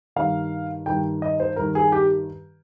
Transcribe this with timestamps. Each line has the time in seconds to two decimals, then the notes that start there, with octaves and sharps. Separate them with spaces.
0.16 G2 D#3 F5
0.86 G2 D#3 G5
1.22 D#5
1.40 C5
1.56 G2 D#3 A#4
1.75 G#4
1.92 G4